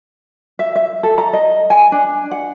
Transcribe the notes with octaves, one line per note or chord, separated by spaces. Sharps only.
E5
E5
A4
A#5
D#5
G#5
D4
F#5